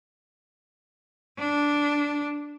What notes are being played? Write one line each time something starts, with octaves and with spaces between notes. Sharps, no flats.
D4